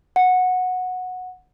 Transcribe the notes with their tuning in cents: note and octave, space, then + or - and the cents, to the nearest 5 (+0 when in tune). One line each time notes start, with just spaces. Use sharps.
F#5 -10